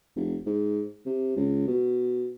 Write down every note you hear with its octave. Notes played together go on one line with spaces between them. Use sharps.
F1
G#2
C3
C#2
B2